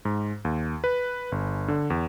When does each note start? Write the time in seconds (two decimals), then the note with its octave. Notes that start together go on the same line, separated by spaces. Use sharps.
0.05 G#2
0.45 D#2
0.84 B4
1.32 G1
1.68 D3
1.90 E2